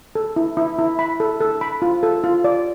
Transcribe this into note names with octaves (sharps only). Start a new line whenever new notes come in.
A4
E4
E4
E4
B5
A4
A4
B5
F4
A4
F4
D5